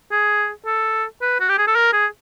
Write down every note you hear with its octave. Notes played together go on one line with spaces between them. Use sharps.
G#4
A4
B4
F#4
G4
G#4
A4
A#4
G#4